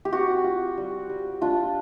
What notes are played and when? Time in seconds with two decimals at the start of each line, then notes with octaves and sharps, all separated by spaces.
0.05 G4
0.12 C4 F#4
0.44 F4
0.78 G3
1.09 G3
1.42 D4 F4